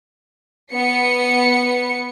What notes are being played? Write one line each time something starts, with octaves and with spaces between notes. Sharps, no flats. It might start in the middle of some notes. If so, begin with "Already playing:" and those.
B3 C#7